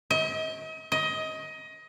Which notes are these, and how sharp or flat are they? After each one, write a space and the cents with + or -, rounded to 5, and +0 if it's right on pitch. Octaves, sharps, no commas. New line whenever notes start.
D#5 +40
D#5 +20